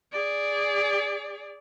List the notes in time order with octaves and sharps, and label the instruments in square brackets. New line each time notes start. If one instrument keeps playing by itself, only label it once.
[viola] G#4 D5